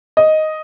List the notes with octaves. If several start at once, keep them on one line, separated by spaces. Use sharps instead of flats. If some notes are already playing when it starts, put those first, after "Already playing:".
D#5